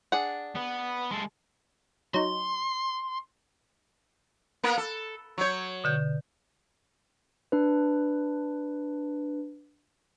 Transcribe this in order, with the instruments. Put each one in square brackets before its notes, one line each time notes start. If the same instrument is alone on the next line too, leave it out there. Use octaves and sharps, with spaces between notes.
[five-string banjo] D4 G#4 F#5
[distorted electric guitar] B3
G#3 A4
[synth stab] F#3 D#4 [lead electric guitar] C6
[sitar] A#3 B3 A#4
A4
[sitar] F#3 C#5 [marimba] C#6 G6
[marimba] B2 D3 G6
[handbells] D4 B4